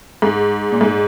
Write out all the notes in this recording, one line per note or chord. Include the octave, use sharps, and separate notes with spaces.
G#2
A#2
G#2